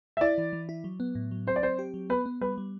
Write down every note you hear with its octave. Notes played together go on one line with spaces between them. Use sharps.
E5
E4 D5
E3
E3
E4
F#3
B3
A2
F#3
C4 C5
D5
C4 C5
G4
F#3
B3 B4
B3
G3 B4
G3